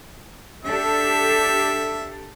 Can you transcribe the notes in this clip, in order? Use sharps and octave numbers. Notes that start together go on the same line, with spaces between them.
D4 G4 A4 E5